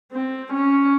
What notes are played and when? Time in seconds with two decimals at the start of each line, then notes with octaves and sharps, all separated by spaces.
0.12 C4
0.52 C#4